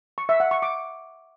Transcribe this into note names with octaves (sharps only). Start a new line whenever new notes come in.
C#6
E5
F#5
C#6
D6